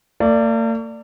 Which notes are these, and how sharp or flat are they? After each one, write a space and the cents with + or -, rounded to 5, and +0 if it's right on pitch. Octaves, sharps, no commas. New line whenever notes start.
A#3 -45 D5 +0